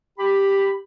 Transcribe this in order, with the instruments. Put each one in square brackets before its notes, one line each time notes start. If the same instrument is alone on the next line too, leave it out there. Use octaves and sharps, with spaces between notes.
[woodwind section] G4 B5